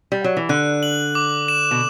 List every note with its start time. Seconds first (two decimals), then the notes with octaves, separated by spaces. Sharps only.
0.12 G3
0.24 F#3
0.37 E3
0.49 D3 F#6
0.83 F#7
1.15 D6
1.48 E7
1.71 B2